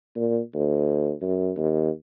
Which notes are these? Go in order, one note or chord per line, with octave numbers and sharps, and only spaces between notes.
A#2
D2
F#2
D#2